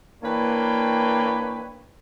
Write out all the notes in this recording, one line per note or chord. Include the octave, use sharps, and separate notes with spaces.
E3 A#3 D4 B4 C#5 G5